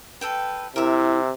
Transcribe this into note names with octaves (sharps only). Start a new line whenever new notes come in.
A4 B4 G5
C3 E4 A#4 E5